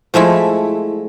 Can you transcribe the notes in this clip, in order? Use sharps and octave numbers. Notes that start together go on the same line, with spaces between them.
F3 G#3 A3 E4